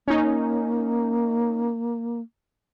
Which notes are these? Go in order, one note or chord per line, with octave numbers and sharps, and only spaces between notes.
A#3 C#4 D#4